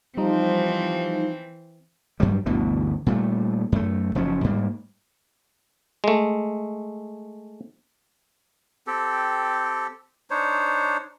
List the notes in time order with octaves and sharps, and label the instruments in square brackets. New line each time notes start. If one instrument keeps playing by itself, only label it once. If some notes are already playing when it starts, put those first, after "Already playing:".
[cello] E3 C4 [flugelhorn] F3 [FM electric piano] G3 D#4
[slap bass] G2 F#3 G3
G1 D2 B2 E3
A#2 G3 A3
F#2 A3
F#1 F3 F#3 C#4
G#2 G3 A#3
[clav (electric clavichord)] G#3 A3
[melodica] C4 G4 A4
D4 D#4 C5 C#5